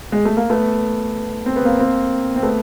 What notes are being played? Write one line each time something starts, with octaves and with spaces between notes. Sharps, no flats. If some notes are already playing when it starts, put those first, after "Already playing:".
G#3
A3
A#3
A3 B3
C4
B3
A#3 C4
A#3 C4
C4
A3 B3